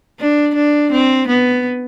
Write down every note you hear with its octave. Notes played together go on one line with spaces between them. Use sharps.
D4
D4
C4
B3